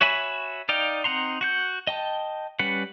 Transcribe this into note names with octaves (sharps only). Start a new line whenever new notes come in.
F#4 C#5 E5 G#5 B5
D#4 D5 F5 G5
C4 D#4 F#5 A#5 C6
F#4 F#5 G6
D#5 G5 A5
G3 C#4 B4 F#5